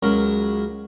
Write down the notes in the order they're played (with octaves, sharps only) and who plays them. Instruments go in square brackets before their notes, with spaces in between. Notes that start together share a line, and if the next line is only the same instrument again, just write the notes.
[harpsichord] C#2 F#3 A#4 A#5 C#6